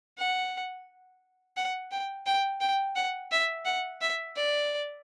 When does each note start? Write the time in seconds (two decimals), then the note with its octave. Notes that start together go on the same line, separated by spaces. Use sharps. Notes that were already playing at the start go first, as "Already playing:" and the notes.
0.18 F#5
1.57 F#5
1.92 G5
2.26 G5
2.61 G5
2.95 F#5
3.31 E5
3.65 F#5
4.01 E5
4.35 D5